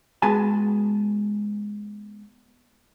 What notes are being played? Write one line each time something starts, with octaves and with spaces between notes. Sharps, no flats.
G#3 B3 F#4 G#5 A5